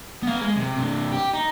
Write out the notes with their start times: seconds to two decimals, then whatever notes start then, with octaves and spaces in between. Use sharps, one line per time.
0.23 B3 F5
0.41 G#3
0.57 C3
0.78 G2 C3
1.12 G4
1.34 D#4